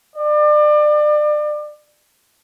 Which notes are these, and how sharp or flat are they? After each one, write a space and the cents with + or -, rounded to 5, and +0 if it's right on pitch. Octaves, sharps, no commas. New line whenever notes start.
D5 +30